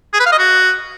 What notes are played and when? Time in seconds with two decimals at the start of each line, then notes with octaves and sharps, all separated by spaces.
0.14 G#4
0.20 B4
0.26 F5
0.32 D#5
0.39 F#4